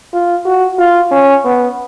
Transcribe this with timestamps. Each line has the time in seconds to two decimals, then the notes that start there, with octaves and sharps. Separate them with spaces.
0.13 F4
0.45 F#4
0.79 F4
1.11 C#4
1.45 B3